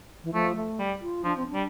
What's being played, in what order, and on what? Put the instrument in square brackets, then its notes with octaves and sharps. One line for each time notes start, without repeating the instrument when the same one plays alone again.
[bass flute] E3
[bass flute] F3 [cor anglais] A3
[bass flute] A3
[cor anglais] G3
[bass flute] F4
[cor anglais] F3 [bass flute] D4
[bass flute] C4
D4
[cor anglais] G3